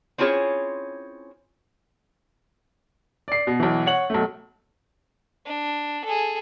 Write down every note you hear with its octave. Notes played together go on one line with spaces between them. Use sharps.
C4 C#4 E4 F4 G#4 C#5
D5 C7
B2
B1 E3
C#5 F#5 F#7
B1 A3
D4
G#4 A4